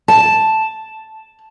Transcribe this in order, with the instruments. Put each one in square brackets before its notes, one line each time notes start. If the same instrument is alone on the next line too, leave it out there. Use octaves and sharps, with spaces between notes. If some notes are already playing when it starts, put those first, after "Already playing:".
[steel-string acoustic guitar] A5